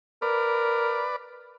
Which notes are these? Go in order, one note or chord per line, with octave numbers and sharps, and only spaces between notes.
A#4 B4 D5